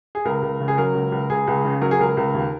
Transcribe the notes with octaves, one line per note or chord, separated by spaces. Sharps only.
G#4
C#2 A#4
C#2
C#3
G#4
F#3 A#4
C#2
C#2
C#2 G#4
C#2
C#3
F#3 A#4
G#4
C#2 A#4
C#2
D#2